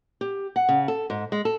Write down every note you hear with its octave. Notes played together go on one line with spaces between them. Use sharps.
G4
F#5
C#3
A4
G#2
G#3
A4